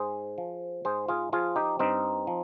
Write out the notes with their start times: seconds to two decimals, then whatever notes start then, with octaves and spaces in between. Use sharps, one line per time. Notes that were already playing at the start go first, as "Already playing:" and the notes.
Already playing: G#2 G#4 C5
0.38 F3
0.85 G#2 G#4 C5
1.08 F4 G#4
1.33 F3 F4 G#4
1.56 D#4 G4
1.79 G2 C4 D#4
2.27 F3